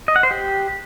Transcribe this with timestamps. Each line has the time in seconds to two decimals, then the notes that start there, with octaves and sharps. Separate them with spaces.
0.08 D#5
0.16 F#5
0.23 C5
0.31 G4